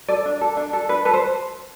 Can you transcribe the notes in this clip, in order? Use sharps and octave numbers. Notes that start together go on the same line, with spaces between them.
A4 D5
D4
A4
D4
A4
D4 B4
A4 B4
C5